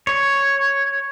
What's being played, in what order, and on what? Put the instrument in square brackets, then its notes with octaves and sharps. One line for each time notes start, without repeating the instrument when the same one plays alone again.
[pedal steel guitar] C#5